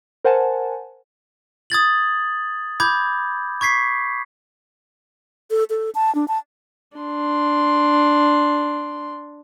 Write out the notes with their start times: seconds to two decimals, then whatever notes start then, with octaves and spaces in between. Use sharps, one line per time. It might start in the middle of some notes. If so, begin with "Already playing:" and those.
0.24 A#4 C5 F#5 G#5 A5
1.70 D#6 G#6 A6 F#7
2.80 B5 D6 G6 G#6
3.61 C#6 G#6 B6 C7
5.51 A4
5.70 A4
5.95 A5
6.15 D4
6.28 A5
6.97 D4 C6